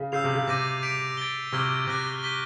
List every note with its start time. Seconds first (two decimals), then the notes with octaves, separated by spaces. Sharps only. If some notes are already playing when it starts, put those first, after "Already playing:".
Already playing: C#3
0.12 C#3 E6 G6 C7 F7
0.24 C3
0.35 C#3
0.47 C3 D6 G6 A#6 D#7
0.82 G6 B6 D7 F7
1.17 A6 D7 G7
1.52 C3 C#6 F6 G#6
1.87 C3 D6 F#6 A#6
2.23 G6 B6 D#7 G7